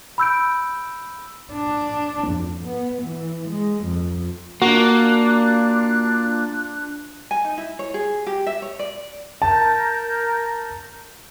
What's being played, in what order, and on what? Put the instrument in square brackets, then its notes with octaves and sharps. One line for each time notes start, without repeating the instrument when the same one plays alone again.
[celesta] B5 E6 G6 D7
[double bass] D4
F2
B3
E3
G#3
F2
[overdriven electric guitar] A#3 [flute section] D4 F4 F#6 [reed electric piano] F#4
[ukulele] G#5
D#4
E4
C#5
G#4
G4
E5
C#5
D5
[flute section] A#4 G6 [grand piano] A5